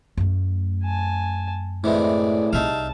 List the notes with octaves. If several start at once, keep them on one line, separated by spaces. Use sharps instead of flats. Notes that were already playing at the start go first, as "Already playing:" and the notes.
F#2 A3
G#5 A5
A2 C3 E3 G#3 G#4 D5
C2 C3 D#4 E5 F5 A5